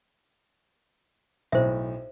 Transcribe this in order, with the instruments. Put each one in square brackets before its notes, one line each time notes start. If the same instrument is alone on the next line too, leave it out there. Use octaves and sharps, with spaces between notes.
[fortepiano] B1 A2 [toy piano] C5 E5